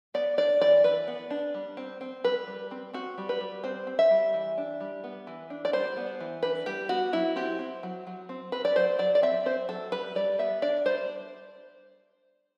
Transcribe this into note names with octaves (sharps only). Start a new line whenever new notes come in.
B3 D5
D4 D5
E3 D5
E3 B4
B3
D4
G3
C4
C4
G3 B4
G3
C4
C4 F#4
G3
B4
G3
C4 C5
C4
E5
G3
E3
D4
G3
B3
E3
D4
D5
G3 C5
B3
E3
D4 B4
G3 G4
B3 F#4
F#3 E4
C4 G4
C4
F#3
F#3
C4
C4 B4
D5
F#3 C5
F#3 D5
D5
C4 E5
C4 C5
F#3 A4
G3 B4
G3 D5
B3 E5
D4 D5
G3 C5